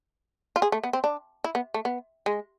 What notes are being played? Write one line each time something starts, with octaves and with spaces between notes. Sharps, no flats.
F4
G#4
A3
B3
C4
D4
E4
B3
A3
B3
G#3